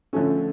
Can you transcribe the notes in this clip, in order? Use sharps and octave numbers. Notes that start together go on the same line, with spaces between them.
D3 F3 A3 C#4 A4